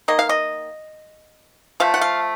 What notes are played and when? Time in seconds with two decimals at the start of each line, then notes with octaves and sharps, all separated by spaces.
0.08 D#3 A#3 D#5
0.19 F5
0.29 D#5
1.80 F3 A3 F5
1.94 F#5
2.01 F5